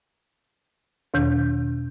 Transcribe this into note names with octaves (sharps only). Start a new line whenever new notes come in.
E2 B2 D#3 G6